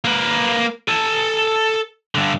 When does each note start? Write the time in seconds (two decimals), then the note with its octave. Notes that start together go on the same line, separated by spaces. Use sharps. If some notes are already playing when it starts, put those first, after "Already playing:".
0.05 A#3 B4
0.88 A4 G#5
2.15 G2 D3